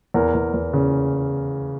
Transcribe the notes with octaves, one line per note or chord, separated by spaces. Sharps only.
E2 A#4
E2
E2
C#3